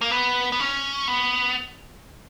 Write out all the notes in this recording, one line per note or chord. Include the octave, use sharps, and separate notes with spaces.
A#3
B3
B3
C#4
B3